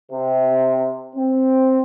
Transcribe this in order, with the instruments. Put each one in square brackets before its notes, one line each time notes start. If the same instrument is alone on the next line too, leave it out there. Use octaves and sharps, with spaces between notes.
[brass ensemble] C3
C4